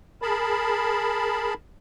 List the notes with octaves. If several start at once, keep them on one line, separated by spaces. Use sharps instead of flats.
G#4 A#4 A5 B5